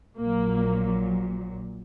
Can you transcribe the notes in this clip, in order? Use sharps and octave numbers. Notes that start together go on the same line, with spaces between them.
A#1 A#2 F#3 A#3